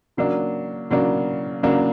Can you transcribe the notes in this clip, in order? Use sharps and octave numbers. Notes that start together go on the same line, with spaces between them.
C#3 F#3 A#3 D4
C#3 F#3 A#3 D4
C#3 F#3 A#3 D4